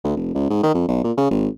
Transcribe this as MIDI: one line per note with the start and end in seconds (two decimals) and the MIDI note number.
0.04 0.15 38
0.16 0.32 29
0.35 0.49 37
0.51 0.58 44
0.63 0.73 51
0.74 0.85 41
0.88 1.00 35
1.04 1.12 46
1.17 1.26 49
1.31 1.48 32